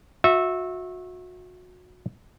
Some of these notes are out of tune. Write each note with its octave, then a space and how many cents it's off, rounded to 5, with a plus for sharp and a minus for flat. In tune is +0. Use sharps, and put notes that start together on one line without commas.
F#4 -30 E5 -10